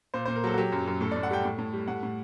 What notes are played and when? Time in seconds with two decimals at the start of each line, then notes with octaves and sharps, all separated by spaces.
0.14 A#2 C5
0.25 A#2 C5
0.36 A#4
0.44 F#3 A4
0.54 F#4
0.58 F#3 G4
0.72 F#2
0.87 F#2
1.01 A2 A4
1.11 A2 D5
1.23 F#5
1.31 G3 G5
1.45 A2
1.59 A2
1.74 G3
1.88 A2 F#5
2.03 A2